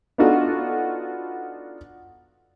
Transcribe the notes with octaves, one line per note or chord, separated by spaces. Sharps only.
B3 D4 D#4 F4 F#4 A4